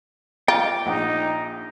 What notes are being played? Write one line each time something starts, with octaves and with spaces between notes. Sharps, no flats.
F4 G5 A#5 D6
A#1 D#4 F#5